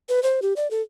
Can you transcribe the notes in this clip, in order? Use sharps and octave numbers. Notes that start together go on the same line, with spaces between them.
B4
C5
G4
D5
A4